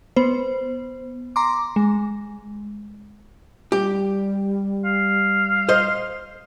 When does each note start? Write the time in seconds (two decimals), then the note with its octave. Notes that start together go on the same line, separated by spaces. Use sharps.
0.16 B3 C5
1.36 A#5 C6 D6
1.76 G#3
3.72 G3 G4
4.85 F5
5.69 C5 D#5